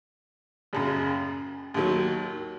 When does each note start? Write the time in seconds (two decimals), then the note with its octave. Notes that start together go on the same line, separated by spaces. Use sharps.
0.73 F#1 F#2 C#3
1.74 D#2 D#3 F#3